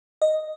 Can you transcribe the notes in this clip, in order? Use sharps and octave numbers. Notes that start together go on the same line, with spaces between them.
D#5